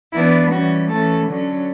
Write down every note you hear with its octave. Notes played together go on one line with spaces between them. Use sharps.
E3 B3 D4 E4
E3 G3 C#4 F#4
E3 A3 C#4 A4
D3 F#3 C#4